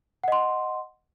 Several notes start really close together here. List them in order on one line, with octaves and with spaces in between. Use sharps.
F#5 D#5 C6